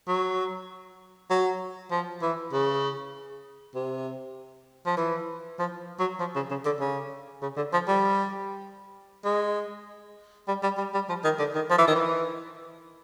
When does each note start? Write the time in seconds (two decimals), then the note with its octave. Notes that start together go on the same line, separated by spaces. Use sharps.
0.08 F#3
1.30 F#3
1.91 F3
2.22 E3
2.53 C#3
3.75 C3
4.86 F3
4.97 E3
5.59 F3
6.00 F#3
6.20 F3
6.35 C#3
6.50 C#3
6.65 D3
6.80 C#3
7.42 C#3
7.57 D3
7.73 F3
7.88 G3
9.25 G#3
10.48 G3
10.63 G3
10.78 G3
10.94 G3
11.09 F3
11.24 D#3
11.39 D3
11.55 D#3
11.70 F3
11.78 E3
11.87 D#3
11.95 E3